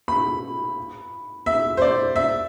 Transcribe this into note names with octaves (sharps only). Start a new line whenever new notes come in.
B5
E5
C5
D5
E5